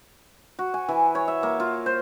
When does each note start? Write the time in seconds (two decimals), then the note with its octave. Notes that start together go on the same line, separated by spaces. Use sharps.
0.59 F#4
0.74 G#5
0.88 E3
1.15 C#5
1.28 E5
1.43 A#3
1.60 F4
1.86 C5